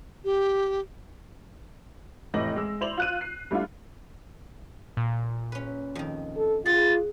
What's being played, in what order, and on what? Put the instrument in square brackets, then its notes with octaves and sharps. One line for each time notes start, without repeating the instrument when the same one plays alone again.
[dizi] G4
[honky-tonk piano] F1 A2 E3 D#5 A#6 F#7
G#3 E6
E4 C5 D5 F7 F#7
F4 F#6 D#7
C7
G3 A3 D4 E4 F4
[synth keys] A#2
[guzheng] C#4 B4
F2 D#3
[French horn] A4
[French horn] F4 [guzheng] G#4 F#5 [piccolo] A6